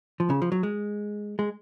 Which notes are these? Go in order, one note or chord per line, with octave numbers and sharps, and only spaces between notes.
F3
C#3
F3
F#3
G#3
G#3